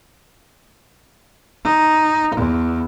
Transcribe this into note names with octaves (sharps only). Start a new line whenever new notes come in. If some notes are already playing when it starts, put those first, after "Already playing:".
D#4
E2